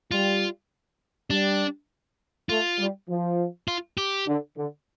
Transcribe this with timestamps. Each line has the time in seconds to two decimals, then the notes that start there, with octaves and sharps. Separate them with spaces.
0.11 G3 F4
1.30 G3 D4
2.49 A3 F4
2.79 G3
3.09 F3
3.68 F4
3.97 G4
4.27 D3
4.57 D3